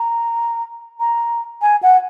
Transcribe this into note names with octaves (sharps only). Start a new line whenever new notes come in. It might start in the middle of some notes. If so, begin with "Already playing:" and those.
Already playing: A#5
A#5
G#5
F#5